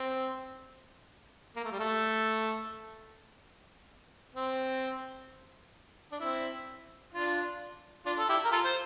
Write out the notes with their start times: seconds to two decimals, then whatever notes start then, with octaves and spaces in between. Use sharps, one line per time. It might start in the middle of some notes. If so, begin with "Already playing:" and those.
Already playing: C4
1.56 A#3
1.64 A3
1.72 G3
1.79 A3
4.35 C4
6.12 D4
6.20 C4 E4
7.13 D4 F4
8.06 D4 F4
8.18 A4
8.29 E4 G4
8.44 A#4
8.52 F4 A4
8.64 C5